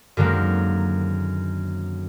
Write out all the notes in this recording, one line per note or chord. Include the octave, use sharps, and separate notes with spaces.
F#2 D3 D#3 G#3 A#3 C4